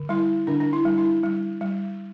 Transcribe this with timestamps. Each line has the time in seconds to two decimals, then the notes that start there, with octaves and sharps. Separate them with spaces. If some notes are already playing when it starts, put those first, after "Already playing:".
Already playing: D3
0.09 G3 E4
0.47 D3 D4
0.60 D4
0.73 E4
0.85 G3
0.98 E4
1.24 G3
1.61 G3